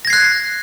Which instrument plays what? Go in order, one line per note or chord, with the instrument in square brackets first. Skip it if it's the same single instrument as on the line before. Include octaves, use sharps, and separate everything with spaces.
[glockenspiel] A#6
G#6
C7
F#6